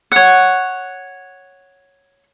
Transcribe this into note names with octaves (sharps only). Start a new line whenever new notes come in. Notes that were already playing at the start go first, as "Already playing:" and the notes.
C#5 F#5